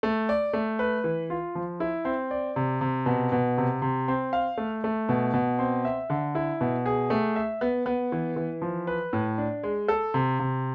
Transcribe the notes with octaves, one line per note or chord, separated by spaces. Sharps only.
A3
D5
A3
B4
E3
F4
F3
E4
C4
D5
C3
C3
B2
B2
C3
C3
C4
F5
A3
A3
B2
B2
C4
E5
D3
E4
B2
G#4
A3
E5
B3
B3
E3
E3
F3
B4
A2
D4
G#3
A4
C3
C3